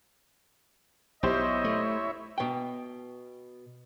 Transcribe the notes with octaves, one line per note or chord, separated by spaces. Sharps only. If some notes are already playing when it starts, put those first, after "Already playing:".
B1 E4 G4 C5 C#5 D#5 E5
A3
B2 G5